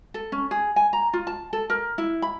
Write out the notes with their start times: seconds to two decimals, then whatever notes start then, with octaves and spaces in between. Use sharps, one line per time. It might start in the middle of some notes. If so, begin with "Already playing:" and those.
0.14 A4
0.32 C#4
0.51 G#4
0.76 G#5
0.93 A#5
1.13 F4
1.27 A5
1.53 A4
1.70 A#4
1.98 E4
2.22 B5